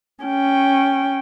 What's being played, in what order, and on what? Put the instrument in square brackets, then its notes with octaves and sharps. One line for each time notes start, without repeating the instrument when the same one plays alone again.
[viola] C#4 G5